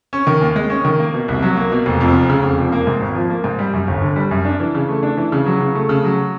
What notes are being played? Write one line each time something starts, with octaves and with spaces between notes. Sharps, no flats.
C#4
D#3
D#2
G#3
C#4
D#3
A#3
B2
C2
F#3
A#3
B2
F1
F2
F1
C#3
F1
F2
A#3
G#2
G#1
F3
A#3
G#2
G3
F#2
G1
D3
G3
F#2
D4
E3
C#3
A3
D4
E3
C#3
F#3
C#3
A3
C#3
F#3